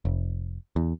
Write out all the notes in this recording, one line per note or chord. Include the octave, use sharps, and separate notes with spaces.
F1
E2